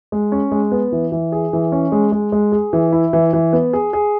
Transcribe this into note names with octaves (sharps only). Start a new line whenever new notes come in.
G#3
C#4
G#3
B3
E3
E3
G#4
E3
C#4
G#3
G#3
G#3
G#4
E3
E4
E3
E3
B3
G#4
G#4